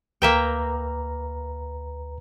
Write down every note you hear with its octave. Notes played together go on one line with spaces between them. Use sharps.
D2 A#3 B4 E5 G5 A#5